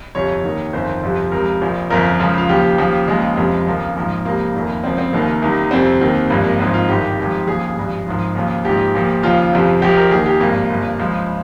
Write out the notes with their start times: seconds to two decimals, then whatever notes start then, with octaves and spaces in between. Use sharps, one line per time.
0.15 G1 F2 C3 C#5
0.44 D#2 D#3
0.73 G1 F2 D#3 C5
1.03 G1 F2 C3 F3
1.32 C#2 C3 F3 A#4
1.61 A#1 A#2 F3
1.90 G1 F2 C#3 F3 A#4
2.19 C#2 C#3 F3
2.38 F4
2.49 D#2 C#3 F3 G4
2.78 D#2 C#3 F3
3.08 D#2 C#3 F3 G#3
3.37 F1 F2 C3 F3
3.67 D#2 C#3 F3 A#3
3.96 A#1 G#2 F3
4.25 C#2 C3 F3 A#3
4.54 F1 F2 D#3
4.84 C#2 C#3 F3 C4
4.98 C4
5.12 F1 D#2 D#3 A#3
5.42 C2 C3 D#3
5.71 G1 F2 C3 C4
6.01 D#2 D#3
6.30 G#1 G2 F3
6.45 A#3
6.59 G#1 G#2 F3 C4
6.74 F4
6.89 G1 G2 D#3 G4
7.18 G#1 G#2 F3
7.47 D#2 C#3 F3 G#4
7.77 G#1 G2 F3
8.06 G#1 G#2 F3
8.35 D#2 C#3 F3
8.65 A#1 G#2 F3 G4
8.94 A#1 A#2 F3
9.23 D#2 C#3 F3 F4
9.53 G1 F2 C3 F3
9.82 A#1 A#2 F3 G4
9.96 A#4
10.11 D#2 D#3 G#4
10.26 G4
10.40 G#1 G2 F3 A#3
10.70 G1 G2 F3
10.99 C#2 C#3 F3 G#3